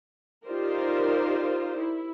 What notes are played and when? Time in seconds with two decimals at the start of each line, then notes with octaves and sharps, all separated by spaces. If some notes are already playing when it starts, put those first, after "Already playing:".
0.47 D#4 F4 G4 A#4 C5 D5
1.78 E4